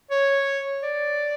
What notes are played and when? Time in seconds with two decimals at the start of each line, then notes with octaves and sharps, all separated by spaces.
0.11 C#5
0.83 D5